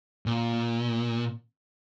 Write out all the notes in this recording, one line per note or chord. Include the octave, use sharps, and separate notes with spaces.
A#2